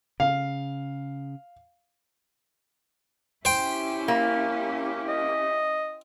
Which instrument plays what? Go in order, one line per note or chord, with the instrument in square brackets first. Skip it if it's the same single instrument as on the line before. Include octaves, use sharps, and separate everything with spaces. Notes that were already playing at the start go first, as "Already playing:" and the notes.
[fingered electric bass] C#3 [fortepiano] F5
[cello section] C#4 E4 G4 [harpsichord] C5 G5
[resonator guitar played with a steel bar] A#3
[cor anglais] D#5